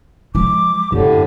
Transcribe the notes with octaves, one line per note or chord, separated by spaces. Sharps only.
F3 G#3 D6
F#2 A2 D3 G4